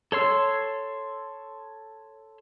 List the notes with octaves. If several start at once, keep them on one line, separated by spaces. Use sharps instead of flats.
A4 C#5 C6 E6